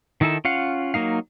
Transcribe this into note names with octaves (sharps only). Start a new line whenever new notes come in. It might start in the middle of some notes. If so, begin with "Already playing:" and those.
D#3 D#4 E4 A4 A5
C#4 F4 F5 F#5
F#3 A#3 D#4 F5